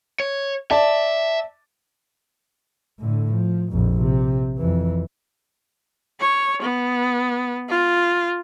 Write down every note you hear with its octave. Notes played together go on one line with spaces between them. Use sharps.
C#5
D5 E5 A5
A2 D3
F3
A#1 F2
C3
F2 E3
C#5
B3
F4